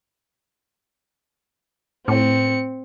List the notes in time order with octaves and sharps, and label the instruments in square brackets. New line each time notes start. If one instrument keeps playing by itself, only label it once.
[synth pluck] A2 [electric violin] C4 C#7